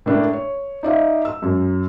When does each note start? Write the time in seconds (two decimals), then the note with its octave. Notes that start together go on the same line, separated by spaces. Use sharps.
0.06 A2 A#3 D4
0.33 C#5
0.83 D#4 D5 E5 F5
1.25 E6
1.42 F#2